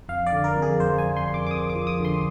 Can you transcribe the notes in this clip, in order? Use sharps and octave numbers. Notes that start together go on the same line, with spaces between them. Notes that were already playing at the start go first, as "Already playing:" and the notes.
F2 F5
D5
D3
A#4
F2
G#4
F2 C5
G#5
F2
C6
F2 C6
D6
D6
F2 D#6
D6
F3
D#6
D3 C6